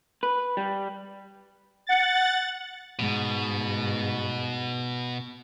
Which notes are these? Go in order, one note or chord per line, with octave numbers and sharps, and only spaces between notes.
B4
G3
F#5 A6
G#2 B2